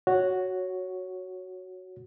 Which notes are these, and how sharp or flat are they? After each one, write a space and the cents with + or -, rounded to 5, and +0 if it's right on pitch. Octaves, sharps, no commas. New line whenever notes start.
F#4 +0 C#5 +0